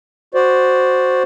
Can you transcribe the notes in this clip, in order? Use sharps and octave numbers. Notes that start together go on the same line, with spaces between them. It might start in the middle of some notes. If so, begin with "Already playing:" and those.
F#4 C5 D5